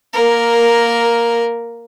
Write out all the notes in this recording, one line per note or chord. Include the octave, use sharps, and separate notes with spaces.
A#3 A#4